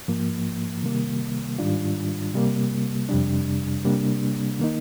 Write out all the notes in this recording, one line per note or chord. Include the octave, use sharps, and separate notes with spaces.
G#2 F3 A#3
C3 D#3 G3 A#3
G#2 D#3 G3 D4 F4
C3 G3 A#3
F2 C3 G3 D4
C3 G3 A#3 D4
D#3 A#3 D#4